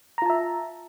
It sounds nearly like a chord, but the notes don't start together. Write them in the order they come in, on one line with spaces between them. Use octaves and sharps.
A#5 F4 A5 E5